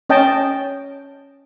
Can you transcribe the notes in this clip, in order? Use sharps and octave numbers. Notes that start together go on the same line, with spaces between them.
C#4 D#5 G5 A5